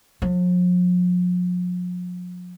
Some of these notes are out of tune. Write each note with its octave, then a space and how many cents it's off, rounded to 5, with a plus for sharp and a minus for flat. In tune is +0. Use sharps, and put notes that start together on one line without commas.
F3 +45